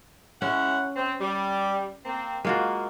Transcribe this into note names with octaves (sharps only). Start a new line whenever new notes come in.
G#3 C#4 E4 F#5
C4
G3
A#3 C4
G#3 A#3 F4 F#4